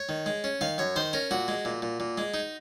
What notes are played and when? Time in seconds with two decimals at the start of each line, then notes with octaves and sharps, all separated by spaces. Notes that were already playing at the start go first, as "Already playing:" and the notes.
Already playing: C#5
0.09 D#3
0.26 G#3
0.44 C#4
0.61 D#3 F5
0.78 F#2 C#5
0.96 D#3 C5
1.13 C#4 A#4
1.31 A#2 F#4
1.48 G#3
1.65 A#2
1.82 A#2
2.00 A#2
2.18 G#3
2.34 D#4